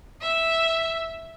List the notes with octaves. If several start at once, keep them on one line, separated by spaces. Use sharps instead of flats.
E5